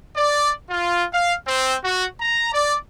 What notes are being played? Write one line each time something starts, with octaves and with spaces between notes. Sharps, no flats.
D5
F4
F5
C4
F#4
A#5
D5